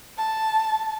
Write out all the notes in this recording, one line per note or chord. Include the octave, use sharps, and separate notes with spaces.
A5